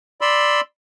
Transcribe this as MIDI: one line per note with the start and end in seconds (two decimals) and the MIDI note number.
0.21 0.61 74
0.21 0.61 83
0.21 0.61 84
0.21 0.61 88